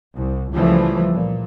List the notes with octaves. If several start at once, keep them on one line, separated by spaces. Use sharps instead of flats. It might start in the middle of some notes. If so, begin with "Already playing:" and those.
C2
C#2 E3 F3 G3 A3
A#2